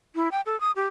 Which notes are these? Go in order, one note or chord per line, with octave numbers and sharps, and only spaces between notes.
E4
G5
A4
D#6
G4